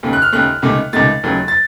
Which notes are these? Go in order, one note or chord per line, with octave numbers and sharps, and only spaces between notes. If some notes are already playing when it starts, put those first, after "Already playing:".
D#2 C#3 A3
F#6
F6
D#2 C#3 A3 F#6
C#2 C3 D#3 A3
C#2 C3 D#3 A3 A6
D#2 C#3 F#3 A3
A6